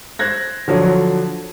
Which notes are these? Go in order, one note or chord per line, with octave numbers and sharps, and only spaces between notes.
C5 F#6 G#6 A#6
D3 F3 F#3